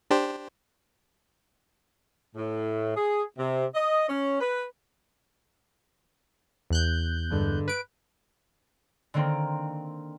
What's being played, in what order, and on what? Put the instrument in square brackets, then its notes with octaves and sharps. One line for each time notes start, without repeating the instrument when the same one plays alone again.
[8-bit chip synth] D4 G4 C5
[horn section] A2
G#4
C3
D#5
C#4
B4
[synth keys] E2 F#6 G6
[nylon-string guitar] G2 D3 G#3
[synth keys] B4 D7
[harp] D3 D#3 A#3 C4